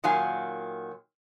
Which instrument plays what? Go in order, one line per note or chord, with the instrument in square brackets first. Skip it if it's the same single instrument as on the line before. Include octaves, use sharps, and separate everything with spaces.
[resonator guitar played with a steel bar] A#2 D#3 F#3 F5 G#5